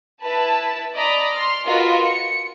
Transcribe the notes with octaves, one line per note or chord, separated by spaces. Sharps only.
E4 B4 A5
D5 D#5 A#5 B5
C6 F6
F4 F#4 A#4 B4 D#5
C#7